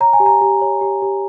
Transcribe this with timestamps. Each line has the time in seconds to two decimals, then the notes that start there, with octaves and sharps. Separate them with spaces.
0.01 C#5 A#5
0.13 G#5
0.20 G4
0.26 A#5
0.41 G4
0.62 C#5
0.81 G4
1.02 G4